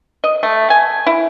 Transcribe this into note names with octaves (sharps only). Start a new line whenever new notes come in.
D#5
A3
G#5
E4